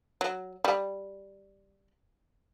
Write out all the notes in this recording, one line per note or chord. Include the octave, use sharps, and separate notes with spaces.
F#3
G3